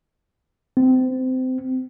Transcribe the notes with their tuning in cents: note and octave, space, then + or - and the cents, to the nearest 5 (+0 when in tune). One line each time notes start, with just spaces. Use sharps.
C4 -25